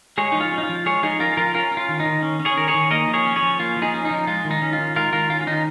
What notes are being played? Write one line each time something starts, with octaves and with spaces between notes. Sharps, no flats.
G#3 G#4 C#5
F3 D#4
F4
C#4
D#4
F4
F3
G#3 G#4 C#5
F3 D#4 G#4
C#4 F4 A#4
F3 F4 A#4
C#4 F4 A#4
C#4
F4
D#3
D#4
D#3
C#4
C#4
G#4 C#5
D#3 A#4
G#4 C#5
D#3
A#3 A#4 D#5
F3
G#4 C#5
C#4
G#4 C#5
F3
A#3 F4
F3
D#4 G#4
C#4
D#4
F3
G#3 F4
D#3
D#4
C#4
F4
D#3
G#3 F4 A#4
D#3 F4 A#4
C#4 F4
F4
D#3 D#4